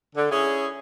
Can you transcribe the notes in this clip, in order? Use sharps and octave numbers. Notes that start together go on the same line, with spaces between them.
D3
C#4 E4 G#4